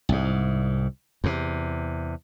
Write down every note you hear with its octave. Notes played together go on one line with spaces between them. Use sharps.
C2 G#2
E2 C3